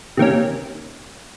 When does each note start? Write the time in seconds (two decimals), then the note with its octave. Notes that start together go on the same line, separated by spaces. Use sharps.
0.17 C3 D#3 A#3 C#4